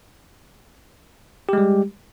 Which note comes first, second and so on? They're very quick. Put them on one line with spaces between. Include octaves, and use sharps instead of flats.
G4 G#3 G3